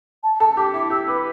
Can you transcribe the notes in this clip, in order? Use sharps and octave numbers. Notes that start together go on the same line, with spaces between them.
A5
A4 A5
G4 D6
E4 D6
G4 E6
B4 D6